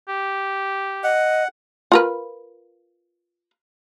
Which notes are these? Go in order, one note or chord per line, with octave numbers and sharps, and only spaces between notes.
G4
D#5 F#5
F4 A#4 B4